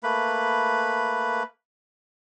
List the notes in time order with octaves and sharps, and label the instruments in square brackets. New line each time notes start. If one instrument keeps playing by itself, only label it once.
[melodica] A3 A#3 B4 B5